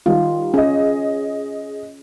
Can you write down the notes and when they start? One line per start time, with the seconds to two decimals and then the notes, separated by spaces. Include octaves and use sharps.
0.06 D#3 G3 F4
0.54 C#4 G#4 D#5